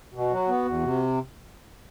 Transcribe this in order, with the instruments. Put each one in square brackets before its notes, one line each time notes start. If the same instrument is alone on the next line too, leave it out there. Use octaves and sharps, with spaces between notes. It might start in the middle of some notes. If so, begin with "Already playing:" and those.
[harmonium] B2 [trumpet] F#4
[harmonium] F#3
B3
E2
C3